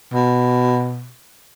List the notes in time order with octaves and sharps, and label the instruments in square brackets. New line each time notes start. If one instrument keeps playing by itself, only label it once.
[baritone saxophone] B2